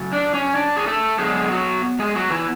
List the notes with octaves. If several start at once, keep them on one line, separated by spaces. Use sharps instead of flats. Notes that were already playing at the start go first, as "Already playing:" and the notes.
Already playing: C#3 F#3 A3
D4
C#4
D4
G#4
A3 A4
D3 F#3 G#3 B3 G#4
F#3 F#4
G#3 G#4
F#3 F#4
E3 E4